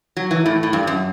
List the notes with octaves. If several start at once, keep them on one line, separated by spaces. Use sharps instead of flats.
F#3
E3
A2
A2
G2
F#2